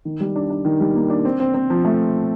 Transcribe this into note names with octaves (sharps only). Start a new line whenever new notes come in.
D#3
G3
D4
D4
D#3
G3
A#3
D4
C4
C4
C4
F3
A3